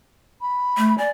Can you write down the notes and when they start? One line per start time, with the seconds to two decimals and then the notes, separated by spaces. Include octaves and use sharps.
0.41 B5
0.77 A3
0.98 D5 G#5